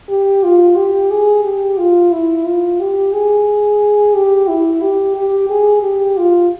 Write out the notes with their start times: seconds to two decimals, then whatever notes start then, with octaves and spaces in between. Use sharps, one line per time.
0.09 G4
0.43 F4
0.76 G4
1.11 G#4
1.44 G4
1.77 F4
2.12 E4
2.45 F4
2.80 G4
3.13 G#4
4.15 G4
4.48 E4
4.82 G4
5.16 G4
5.50 G#4
5.83 G4
6.17 F4